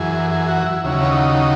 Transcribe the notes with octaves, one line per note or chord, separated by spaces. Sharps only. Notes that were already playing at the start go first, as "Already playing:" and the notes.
Already playing: F#2 E3 G#4
G#4
F#4
E4
D#2 C#3 F#3 E4
C#4
D#4